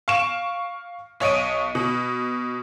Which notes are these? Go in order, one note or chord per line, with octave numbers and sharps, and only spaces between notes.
F5 C#6 D7 E7
B1 C#5 D#5 D7 D#7
B2